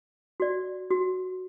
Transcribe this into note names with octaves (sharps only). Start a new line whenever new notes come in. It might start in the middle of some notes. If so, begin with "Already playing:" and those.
F#4 D5
F#4